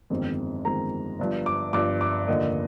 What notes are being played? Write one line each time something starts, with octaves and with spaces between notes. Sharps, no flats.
G1 F2 D#3 G#3 C4
G1 F2 D#3 G#3 C4 A#5
G1 G2 F3
D6
G1 G2 F3 D6
D6
F1 D#2 D3 F3 A#3 D#5